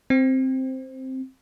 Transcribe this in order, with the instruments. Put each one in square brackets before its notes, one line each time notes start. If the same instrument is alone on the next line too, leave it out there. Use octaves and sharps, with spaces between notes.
[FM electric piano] C4